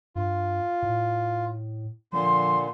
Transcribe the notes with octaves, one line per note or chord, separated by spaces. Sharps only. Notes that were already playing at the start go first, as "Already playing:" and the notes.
G2 F4
A2
A#2 D3 F3 C6